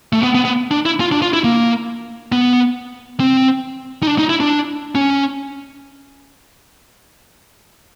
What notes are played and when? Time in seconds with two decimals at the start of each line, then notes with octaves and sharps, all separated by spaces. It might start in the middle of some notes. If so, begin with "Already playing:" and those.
0.13 A3
0.23 B3
0.35 B3
0.45 B3
0.71 D4
0.86 E4
1.00 F4
1.12 D4
1.22 F4
1.33 E4
1.44 A#3
2.32 B3
3.20 C4
4.03 D#4
4.07 D4
4.19 D#4
4.29 E4
4.40 D4
4.95 C#4